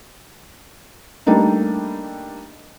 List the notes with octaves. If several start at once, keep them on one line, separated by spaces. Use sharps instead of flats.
G3 A3 A#3 D4 D#4